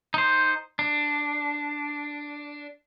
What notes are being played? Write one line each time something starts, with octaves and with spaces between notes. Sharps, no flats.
D#4 C5
D4